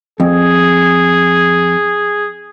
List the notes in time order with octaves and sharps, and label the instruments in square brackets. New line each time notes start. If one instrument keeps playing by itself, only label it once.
[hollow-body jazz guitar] F2 [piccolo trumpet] G#4